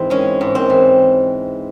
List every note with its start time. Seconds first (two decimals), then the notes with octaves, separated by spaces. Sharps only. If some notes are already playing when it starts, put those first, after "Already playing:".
Already playing: G#2 E3 C4
0.10 G#3 C#4
0.41 G#2
0.55 C4
0.70 E3